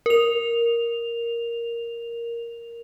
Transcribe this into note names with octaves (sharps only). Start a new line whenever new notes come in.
A#4 F7